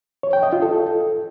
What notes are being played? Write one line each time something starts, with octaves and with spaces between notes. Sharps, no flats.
C#5
G5
D#5
F4
A4